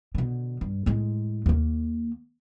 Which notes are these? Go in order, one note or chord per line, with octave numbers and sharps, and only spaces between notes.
B2 D3
G2
A2 G#3
D#2 A#3